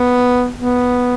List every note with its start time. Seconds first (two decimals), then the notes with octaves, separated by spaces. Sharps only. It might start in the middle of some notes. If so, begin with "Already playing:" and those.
Already playing: B3
0.57 B3